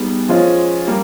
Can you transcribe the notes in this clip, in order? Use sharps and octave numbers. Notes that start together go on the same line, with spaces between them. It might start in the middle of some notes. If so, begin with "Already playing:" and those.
Already playing: G3 B3 D#4 G#4
F3 G#3 C#4 F4
G3 A#3